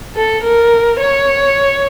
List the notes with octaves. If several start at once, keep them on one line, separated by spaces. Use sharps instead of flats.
A4
A#4
C#5